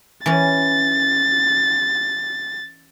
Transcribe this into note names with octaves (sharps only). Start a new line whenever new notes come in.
E3 C#4 A6